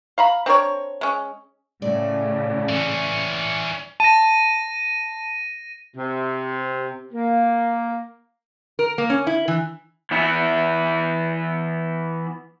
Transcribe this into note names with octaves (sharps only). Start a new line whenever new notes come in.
F5 A#5 B5
C4 D4 A#4 C#5
G#3 C#4
A2 C#3 D5
E3 C#4
A5 A#6 D#7
C3
A#3
A#4
A#3
C#4
E4
E3
E3 B3 E4